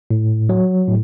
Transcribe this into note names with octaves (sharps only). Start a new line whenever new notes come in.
A2
F#3
A2